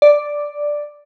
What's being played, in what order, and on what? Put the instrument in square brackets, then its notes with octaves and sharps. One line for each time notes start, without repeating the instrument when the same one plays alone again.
[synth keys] D5